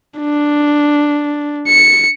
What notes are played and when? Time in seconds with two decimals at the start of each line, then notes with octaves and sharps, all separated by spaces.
0.19 D4
1.68 C#7